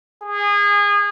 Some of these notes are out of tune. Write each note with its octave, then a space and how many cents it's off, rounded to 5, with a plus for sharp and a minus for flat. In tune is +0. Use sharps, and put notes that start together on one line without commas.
G#4 -25